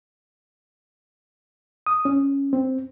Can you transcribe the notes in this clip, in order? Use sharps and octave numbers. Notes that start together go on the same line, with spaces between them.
D#6
C#4
C4